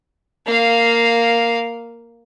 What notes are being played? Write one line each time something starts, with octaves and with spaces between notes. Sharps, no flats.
A#3 F5